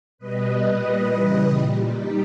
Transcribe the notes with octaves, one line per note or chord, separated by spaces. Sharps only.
B2 G3 B4 D#5
A#2 G3
C#3 E3 G3
A#2 G3
G3 D#4 G4